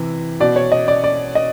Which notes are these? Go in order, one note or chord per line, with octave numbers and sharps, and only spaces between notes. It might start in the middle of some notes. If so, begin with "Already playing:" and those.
Already playing: C3 E3
B2 D5
C#5
D#5
D5
D5
D#5